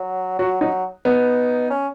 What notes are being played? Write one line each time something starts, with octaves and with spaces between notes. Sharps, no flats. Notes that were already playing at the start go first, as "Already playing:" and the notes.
Already playing: F#3
F#3 F#4
F#3 D#4
B3 D#4
C#4